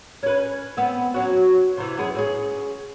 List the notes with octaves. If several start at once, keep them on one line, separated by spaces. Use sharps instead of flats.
C#4 B4
B3 C4
F#3 C#4 F#4
C3 E3
F#2 B3 G#4
C4 C#4 G#4